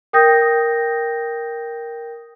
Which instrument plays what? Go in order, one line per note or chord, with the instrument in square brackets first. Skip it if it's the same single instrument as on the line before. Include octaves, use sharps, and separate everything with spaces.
[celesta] A#4 G5 D#6 G6 A#6